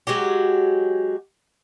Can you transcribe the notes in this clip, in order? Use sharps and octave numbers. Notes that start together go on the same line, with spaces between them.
F#3 G#3 F#4 G4